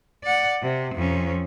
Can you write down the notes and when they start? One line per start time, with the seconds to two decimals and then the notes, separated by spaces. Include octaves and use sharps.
0.24 D5 F#5
0.62 C3
0.95 F2 C#4